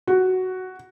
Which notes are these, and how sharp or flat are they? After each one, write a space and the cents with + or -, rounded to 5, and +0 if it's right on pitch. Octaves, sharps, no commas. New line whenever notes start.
F#4 +5